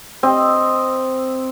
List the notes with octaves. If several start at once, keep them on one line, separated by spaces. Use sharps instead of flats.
C4 D#5